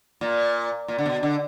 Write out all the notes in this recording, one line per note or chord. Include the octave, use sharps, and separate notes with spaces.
A#2
A#2
D3
B2
D3